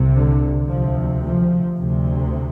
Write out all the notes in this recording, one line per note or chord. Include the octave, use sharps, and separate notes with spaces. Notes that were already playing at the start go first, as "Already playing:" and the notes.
Already playing: C2 C3
D3
D2 C3 F3
F3
D2 C3